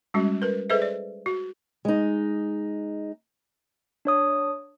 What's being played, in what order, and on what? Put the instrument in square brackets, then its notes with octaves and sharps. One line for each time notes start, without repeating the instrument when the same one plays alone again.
[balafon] G3 G#3 C#4 F#4
A#4 B4
G#4 A4 B4 C5 D#5 E5
D5
F#4
[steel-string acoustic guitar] G#3 D#4
[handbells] D4 C#5 D#6